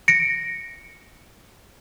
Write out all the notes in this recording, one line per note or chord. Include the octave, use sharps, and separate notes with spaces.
A#6 C#7 D7